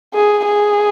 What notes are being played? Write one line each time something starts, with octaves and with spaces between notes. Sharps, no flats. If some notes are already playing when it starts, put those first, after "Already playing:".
G#4
G#4